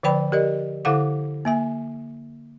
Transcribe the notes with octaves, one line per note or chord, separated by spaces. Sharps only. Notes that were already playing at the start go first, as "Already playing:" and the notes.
D3 F3 B4 D5 G5 B5
G4 A#4 D5 D#5
D3 E4 A4 F5 F#5 D6
A#3 E5 G#5